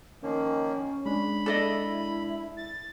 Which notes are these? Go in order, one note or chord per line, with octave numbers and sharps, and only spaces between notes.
D#3 F3 A#3 C#4
G#3 D4 B5
E4 A4 D5 D#5
A6